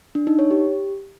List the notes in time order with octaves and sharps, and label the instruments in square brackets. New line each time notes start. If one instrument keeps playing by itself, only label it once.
[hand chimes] D4
D#4
C#5
G4